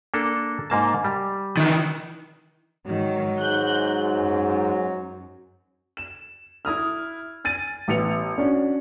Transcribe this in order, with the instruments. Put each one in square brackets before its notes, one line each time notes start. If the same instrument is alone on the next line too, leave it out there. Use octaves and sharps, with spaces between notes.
[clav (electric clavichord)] A#3 D4 A4
G#2 A#3 A5
G3
[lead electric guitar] D#3 E3
[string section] G#2 D#3 [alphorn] F#3
[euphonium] G#2 [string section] F#6 G6
[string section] F#2
[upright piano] E7
E4 D#6 F6
G#5 A6 D#7
A1 B3 C#7 F7
C#4 D4 F#4